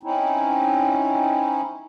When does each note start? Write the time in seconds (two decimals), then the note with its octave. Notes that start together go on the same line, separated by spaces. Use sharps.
0.03 C4 C#4 D#4 E4